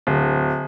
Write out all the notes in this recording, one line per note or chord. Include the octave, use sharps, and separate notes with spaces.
D1